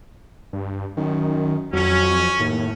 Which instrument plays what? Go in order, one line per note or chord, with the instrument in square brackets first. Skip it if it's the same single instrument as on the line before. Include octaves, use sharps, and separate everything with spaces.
[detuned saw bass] G2
[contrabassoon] F#2 [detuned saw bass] D#3
[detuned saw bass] F2 [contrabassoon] F#3 [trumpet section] C#4
[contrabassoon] D#2 [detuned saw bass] A2